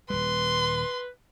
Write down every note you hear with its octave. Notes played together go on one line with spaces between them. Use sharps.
D#1 G3 B4 C6